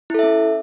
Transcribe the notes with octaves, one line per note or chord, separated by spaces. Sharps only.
C#4 E4 A4 E5